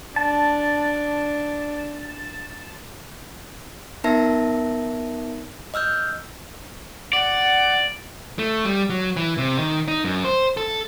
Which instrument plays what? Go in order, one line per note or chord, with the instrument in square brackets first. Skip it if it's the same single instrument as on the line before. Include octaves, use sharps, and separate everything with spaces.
[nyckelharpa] D4 [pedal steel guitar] A5
[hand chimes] B3 D#4 A#4 E5 A5 A#6
D#5 E6 F6 G6
[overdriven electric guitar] D5 [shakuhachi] F#5
[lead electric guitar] A3
G3
F#3
E3
C3
D#3
D#4
F#2
C5
A4